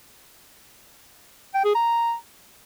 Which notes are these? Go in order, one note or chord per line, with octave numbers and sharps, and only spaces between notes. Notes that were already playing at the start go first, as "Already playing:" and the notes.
G5
G#4
A#5